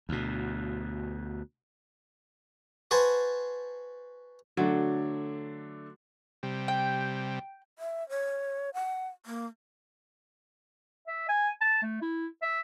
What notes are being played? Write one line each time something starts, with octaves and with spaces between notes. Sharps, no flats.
D2 B2
F#4 B4 C5 G#5 A5
D3 F#3 A3 D4
C3 G3
G5
E5
C#5
F#5
A#3
E5
G#5
A5
A3
E4
E5